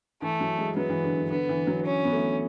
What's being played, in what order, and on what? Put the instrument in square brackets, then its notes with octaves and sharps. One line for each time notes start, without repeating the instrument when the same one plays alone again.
[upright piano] E3 [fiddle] A3
[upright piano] F#3
G#3
[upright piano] F#3 [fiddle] B3
[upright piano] E3
D3
D3
[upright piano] D3 [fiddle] B3
[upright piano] E3
F#3
[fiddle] C#4
[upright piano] B3
A3